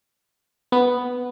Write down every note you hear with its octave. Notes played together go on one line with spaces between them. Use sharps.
B3